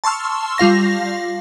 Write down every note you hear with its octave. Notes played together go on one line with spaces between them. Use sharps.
A5 C6 C#6 E6 F6
G3 F4 F5 A#6